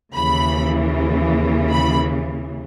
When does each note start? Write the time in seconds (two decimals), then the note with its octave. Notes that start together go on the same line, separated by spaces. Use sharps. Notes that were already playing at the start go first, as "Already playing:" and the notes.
0.14 D#2 C#3 E3 B5
1.71 B5